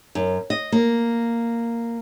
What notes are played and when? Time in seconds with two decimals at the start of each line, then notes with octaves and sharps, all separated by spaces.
0.15 F#2
0.50 D#5
0.72 A#3